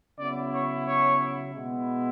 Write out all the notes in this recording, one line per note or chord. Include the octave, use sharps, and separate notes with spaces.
C#3 F#3 B3 E4 D5
C#5
C#5
B2 G#3 B3 E4